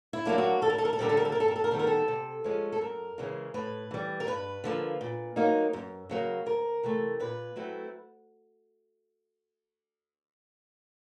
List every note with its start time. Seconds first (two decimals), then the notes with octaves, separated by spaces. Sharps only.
0.13 E4
0.25 F#3 A#3 D4
0.38 F#4
0.62 D#2 A4
0.70 A#4
0.78 A4
0.85 A#4
0.93 A4
0.99 D3 G3 C4 A#4
1.09 A4
1.17 A#4
1.25 A4
1.32 A#4
1.35 G2 A4
1.48 A#4
1.56 A4
1.64 A#4
1.71 D#3 G3 B3 A4
1.79 A#4
1.87 A4
2.08 C3
2.44 F3 G#3 C#4
2.72 A4
2.81 F#2 A#4
3.18 C#3 E3 G#3 C#4
3.54 A2 B4
3.91 E3 G3
4.20 A#4
4.27 G2 B4
4.64 D3 F3 A#3
5.01 A#2
5.36 F#3 A#3 D#4
5.73 F#2
6.09 C#3 F#3 A#3
6.46 D2 A#4
6.83 C3 E3 A3
7.20 A#2 B4
7.56 F#3 A3 C4 E4